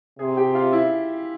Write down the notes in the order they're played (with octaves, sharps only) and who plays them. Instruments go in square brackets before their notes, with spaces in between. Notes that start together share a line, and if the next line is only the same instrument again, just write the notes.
[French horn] C3 [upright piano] G#4 G#5
[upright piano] G4 G5
F4 F5
E4 E5